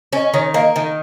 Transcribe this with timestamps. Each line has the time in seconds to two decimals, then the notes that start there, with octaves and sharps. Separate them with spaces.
0.13 C#4 D#5
0.34 D#3 C#5
0.54 A#3 D#5
0.76 D#3